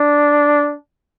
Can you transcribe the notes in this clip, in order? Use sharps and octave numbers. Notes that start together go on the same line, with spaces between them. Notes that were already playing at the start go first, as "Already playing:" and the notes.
Already playing: D4